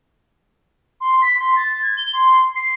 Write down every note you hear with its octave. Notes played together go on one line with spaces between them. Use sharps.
C6
B6
C6
A6
G#6
G7
C6
C7